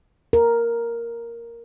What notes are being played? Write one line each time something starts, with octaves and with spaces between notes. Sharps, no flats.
A#4